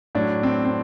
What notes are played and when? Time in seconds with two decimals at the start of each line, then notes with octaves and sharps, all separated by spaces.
0.15 A2 F#3 D4
0.43 C4
0.65 C4